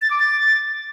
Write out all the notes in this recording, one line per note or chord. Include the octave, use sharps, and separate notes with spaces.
A6
D6
A6